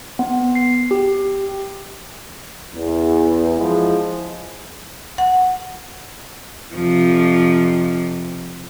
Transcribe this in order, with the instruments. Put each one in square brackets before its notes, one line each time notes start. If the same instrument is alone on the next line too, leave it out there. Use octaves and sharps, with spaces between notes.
[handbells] B3
C7
G4
[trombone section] E2
F3 G#3 E4
[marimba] F#5
[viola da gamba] F2 C3 F3